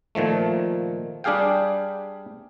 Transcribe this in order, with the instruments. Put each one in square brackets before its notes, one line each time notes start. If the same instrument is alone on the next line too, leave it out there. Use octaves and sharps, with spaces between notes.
[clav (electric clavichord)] A#2 D#3 F3 A3
G3 D4 G4 G#4 F5 G5